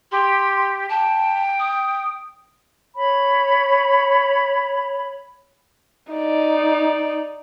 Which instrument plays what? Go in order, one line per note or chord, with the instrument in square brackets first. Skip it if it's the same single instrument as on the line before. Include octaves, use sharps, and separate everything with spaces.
[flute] G4 [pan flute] C6
[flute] G5 [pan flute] A5
[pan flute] D#6
[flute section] C#5 B5
[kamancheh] D#4 D5